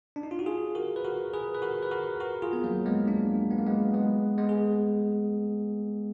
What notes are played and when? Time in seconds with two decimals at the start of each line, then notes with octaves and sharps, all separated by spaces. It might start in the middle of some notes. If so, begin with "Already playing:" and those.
0.16 D4
0.23 D#4
0.31 F4
0.39 F#4
0.46 F4 G#4
0.75 F#4 A#4
0.96 B4
1.05 F#4 A#4
1.33 G#4 B4
1.54 B4
1.62 F#4 A#4
1.83 B4
1.91 F#4 A#4
2.20 F#4 A#4
2.42 F4 G#4
2.53 B3
2.64 F#3 A#3
2.86 G#3 B3
3.08 A#3 D4
3.51 B3
3.58 A#3
3.67 G#3 B3
3.94 G#3 B3
4.38 G#3 B3
4.49 G#4